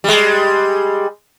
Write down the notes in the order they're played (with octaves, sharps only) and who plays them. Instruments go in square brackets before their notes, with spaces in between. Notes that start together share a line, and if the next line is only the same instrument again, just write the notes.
[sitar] G3 G#3